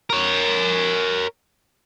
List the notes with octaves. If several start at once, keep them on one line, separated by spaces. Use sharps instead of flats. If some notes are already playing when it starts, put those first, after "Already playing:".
A#4 C#5